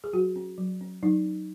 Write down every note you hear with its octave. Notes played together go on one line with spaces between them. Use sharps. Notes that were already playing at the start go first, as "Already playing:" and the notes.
G#4
F#3 F#4
C#4
F#3
C#4
F#3 D#4
C#4